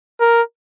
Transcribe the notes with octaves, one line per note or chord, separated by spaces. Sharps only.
A#4